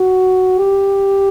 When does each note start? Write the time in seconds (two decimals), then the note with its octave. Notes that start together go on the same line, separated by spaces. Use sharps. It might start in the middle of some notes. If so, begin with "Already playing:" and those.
Already playing: F#4
0.59 G4